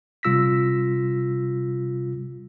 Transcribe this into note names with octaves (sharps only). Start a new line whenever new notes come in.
C3 G3 F4 E6 A#6 B6